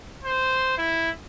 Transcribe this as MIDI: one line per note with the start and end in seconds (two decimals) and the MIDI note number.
0.24 0.74 72
0.78 1.10 64